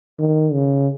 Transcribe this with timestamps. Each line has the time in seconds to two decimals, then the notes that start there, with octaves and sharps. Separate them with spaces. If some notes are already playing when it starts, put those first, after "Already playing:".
0.19 D#3
0.53 C#3